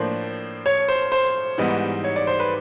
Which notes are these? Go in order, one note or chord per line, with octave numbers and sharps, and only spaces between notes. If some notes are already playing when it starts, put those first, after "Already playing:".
Already playing: A2 F3 A#3 D4 C5
C#5
C5
C5
G#2 E3 G3 B3 D#4
C#5
D5
C5
B4